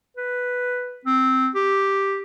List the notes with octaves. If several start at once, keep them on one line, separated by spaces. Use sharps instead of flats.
B4
C4
G4